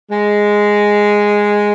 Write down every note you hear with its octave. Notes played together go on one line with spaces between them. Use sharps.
G#3